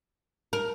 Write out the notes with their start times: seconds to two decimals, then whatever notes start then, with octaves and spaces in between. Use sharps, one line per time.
0.53 A#4